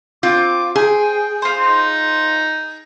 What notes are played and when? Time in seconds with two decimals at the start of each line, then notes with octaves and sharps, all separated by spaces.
0.23 C4 F4 D6
0.76 G#4 G5
1.42 F4 C5
1.59 D#4